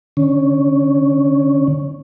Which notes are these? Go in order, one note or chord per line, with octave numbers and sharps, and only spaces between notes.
D3 C#4